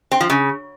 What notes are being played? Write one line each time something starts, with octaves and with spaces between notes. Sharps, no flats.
C4
F3
C#3